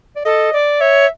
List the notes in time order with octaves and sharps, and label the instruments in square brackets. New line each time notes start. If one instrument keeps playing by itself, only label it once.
[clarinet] D5
[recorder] A4 [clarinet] D#5
[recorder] D5
[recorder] C#5 [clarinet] E5